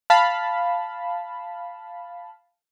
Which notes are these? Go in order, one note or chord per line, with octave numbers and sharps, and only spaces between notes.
F5 A5 B5